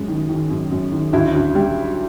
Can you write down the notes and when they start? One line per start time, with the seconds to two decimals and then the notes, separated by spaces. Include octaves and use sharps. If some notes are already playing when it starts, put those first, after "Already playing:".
Already playing: F#2 G#3
0.08 D#3
0.29 D#3
0.50 F#2
0.71 F#2
0.92 D#3
1.13 D2 E4
1.35 D2
1.55 G3